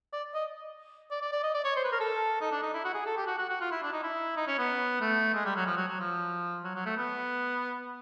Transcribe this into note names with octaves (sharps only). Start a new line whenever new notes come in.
D5
D#5
D5
D5
D5
D#5
D5
C#5
C5
B4
A#4
A4
D#4
D4
D#4
E4
F#4
G#4
A4
G4
F#4
F#4
F#4
F4
E4
D4
D#4
E4
D#4
C#4
B3
A3
G#3
G3
F#3
F3
F#3
F#3
F3
F#3
F#3
A3
B3